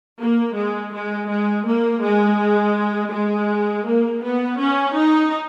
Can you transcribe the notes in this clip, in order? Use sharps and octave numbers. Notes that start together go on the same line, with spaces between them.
A#3
G#3
G#3
G#3
A#3
G#3
G#3
A#3
B3
C#4
D#4